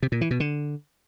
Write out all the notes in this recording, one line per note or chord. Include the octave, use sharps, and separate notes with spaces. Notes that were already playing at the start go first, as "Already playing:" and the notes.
C3
A#2
E3
B2
D3